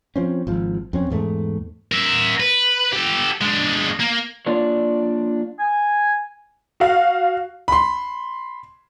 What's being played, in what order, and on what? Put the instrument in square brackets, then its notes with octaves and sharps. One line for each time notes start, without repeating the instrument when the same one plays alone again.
[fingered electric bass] F3 C4 C#4
G#1 F3
F2 C4 C#4
E2 G#2 A3
[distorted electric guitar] A#4 E5
B4
G4 A4
G#3 D4
A#3
[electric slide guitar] A#3 D4 F4 C#5 D5
[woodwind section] G#5
[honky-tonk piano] F#4 F5
[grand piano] B5 C6